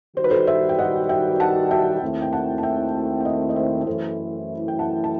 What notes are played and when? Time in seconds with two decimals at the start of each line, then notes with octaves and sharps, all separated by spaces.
0.16 D#3 G3 D#4 F#4 C5
0.24 B4
0.31 A4 C5
0.47 C5 E5
0.69 G5
0.79 D#5 F#5
1.09 E5 G5
1.40 F#5 A5
1.71 E5 G5
2.01 D#2 D#3 A3 C4 E4
2.22 G5
2.33 F#5 A5
2.58 A5
2.63 E5 G5
3.20 G5
3.25 D#5 F#5
3.49 D#5
3.56 C5 E5
3.87 F#2 E3 A3 E4 A4 C5
4.68 G5
4.79 F#5 A5
5.04 A5